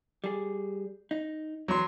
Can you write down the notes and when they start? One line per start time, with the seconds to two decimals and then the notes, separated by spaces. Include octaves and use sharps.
0.24 G3 G#4
1.11 D#4
1.68 E2 F#3 C6